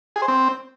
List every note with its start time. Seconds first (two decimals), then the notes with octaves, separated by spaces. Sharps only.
0.16 G#4
0.22 C5
0.28 C4